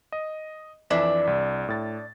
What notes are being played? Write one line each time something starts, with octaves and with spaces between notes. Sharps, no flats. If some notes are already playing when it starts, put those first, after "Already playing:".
D#5
F2 E3 D4 E5
C2
A2 A6